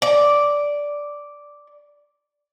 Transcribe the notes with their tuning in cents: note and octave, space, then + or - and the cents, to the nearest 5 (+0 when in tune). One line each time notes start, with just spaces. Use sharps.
D5 -5